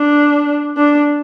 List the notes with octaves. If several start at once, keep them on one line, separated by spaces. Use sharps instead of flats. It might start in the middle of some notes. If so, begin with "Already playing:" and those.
Already playing: D4
D4